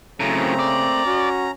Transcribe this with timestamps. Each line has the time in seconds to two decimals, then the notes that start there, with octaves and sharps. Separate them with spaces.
0.20 F#2 A2 C#3 A3 A#3 C4 A#5
0.59 D5
1.05 C#4 F#4